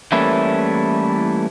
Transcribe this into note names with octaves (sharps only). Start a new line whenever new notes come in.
E3 G3 A3 A#3 C#4 E4